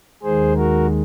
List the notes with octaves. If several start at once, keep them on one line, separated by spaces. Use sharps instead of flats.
D#2 D#3 G#3 G#4 C5
F#4 A#4